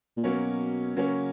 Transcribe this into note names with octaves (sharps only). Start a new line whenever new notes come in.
A#2
B2 F#3 A#3 C#4
C#3 F#3 A#3 C#4